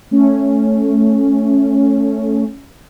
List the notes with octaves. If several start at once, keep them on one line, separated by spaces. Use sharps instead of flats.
A3 C#4